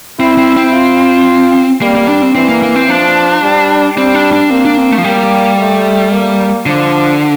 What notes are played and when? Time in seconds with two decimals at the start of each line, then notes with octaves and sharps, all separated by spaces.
0.19 C4 E4
0.37 C4
0.56 C4
0.74 F4
1.82 G3 A#3
1.95 A#3
2.08 D4
2.22 C4
2.35 E3 C4
2.49 A#3
2.62 A#3
2.75 C4
2.89 F3 D4
3.43 G3
3.97 G3 C4
4.14 D4
4.33 D4
4.50 A#3 C4
4.65 D4
4.78 C4
4.92 A3
4.98 F3
5.04 G3 A#3
5.59 A3
6.12 A#3
6.66 D3 F3